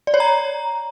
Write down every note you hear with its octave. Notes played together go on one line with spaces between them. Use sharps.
D5
C#5
A#5